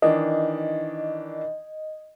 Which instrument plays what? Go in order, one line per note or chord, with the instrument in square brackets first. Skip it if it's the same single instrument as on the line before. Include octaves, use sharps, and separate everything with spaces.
[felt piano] D#3 E3 D4 [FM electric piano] D#5